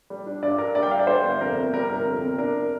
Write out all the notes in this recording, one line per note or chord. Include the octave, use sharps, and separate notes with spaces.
G3
D4
G2 D5
G2 A#4
G3 D5
G5
D4 F5
D5
G3 C5
G1
F2 A#4
C3
G3 A#4
G1 A#4
F2
C3
D4 A#4